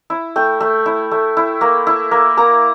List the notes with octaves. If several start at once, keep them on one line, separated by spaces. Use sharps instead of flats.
E4
A3 G5
A3
E4
A3
E4
A#3
E4
A#3
A#3 A#5